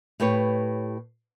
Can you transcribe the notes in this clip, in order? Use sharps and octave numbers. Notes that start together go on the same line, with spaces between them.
A2 G4 B4 C#5